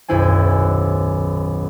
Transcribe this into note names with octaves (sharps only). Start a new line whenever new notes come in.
D#1 B1 F#2 E4 C5 G#5